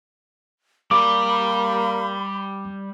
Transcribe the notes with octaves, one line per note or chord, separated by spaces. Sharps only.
G3 A#3 D5 B5 D6